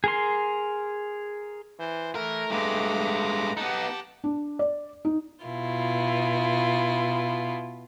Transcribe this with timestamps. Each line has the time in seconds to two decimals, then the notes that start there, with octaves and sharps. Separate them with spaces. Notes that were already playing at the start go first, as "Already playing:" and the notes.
0.04 G#4 A#4 C6
1.79 E3 C5
2.15 E3 A3 A#4
2.50 G2 G#3 B3 A#5 D6
3.57 B3 D#4 G4 F#5 A5
4.24 D4
4.59 D5
5.05 D#4
5.45 B2 E4 F4